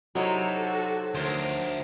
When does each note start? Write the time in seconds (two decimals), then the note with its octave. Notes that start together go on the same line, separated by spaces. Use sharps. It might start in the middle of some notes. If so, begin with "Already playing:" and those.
0.15 C3 F#3 D#4 E4 F#4 A4 C#5
1.15 D2 F3 A#4 C5